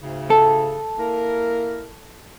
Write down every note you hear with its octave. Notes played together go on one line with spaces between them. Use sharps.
D2 G#2 C#3
A4
A#3 E4 A#4